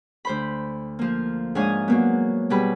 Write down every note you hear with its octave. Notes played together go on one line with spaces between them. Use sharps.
D2 C5 B5
F3 A#3
G#2 D4 C#5 F5 G#5 D#6
F#3 A#3 B3
B2 G3 G#4 B4 B5